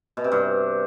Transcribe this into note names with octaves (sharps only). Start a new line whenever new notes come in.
B2
C3
G2